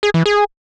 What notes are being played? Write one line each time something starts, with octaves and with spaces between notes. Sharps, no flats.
G#4
E3
G#4